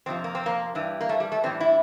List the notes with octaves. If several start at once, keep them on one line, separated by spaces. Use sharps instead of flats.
F2 C3 F3 C4
A#3
C4
A#3
G2 E3 G3
A#3
A3
G3
A3
A2 E3 G3 C4
E4